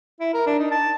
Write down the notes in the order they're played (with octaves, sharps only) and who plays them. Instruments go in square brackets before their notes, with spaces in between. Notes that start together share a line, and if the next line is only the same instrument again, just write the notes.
[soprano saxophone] E4
A#4
D4
D#4
A5